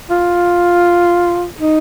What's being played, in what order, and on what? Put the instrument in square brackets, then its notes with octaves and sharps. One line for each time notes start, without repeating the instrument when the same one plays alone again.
[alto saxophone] F4
D#4